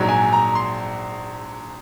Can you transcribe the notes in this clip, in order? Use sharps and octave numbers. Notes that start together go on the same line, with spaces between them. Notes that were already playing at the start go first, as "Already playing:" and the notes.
Already playing: A#1 G#2 F#3
G#5
A#5
C6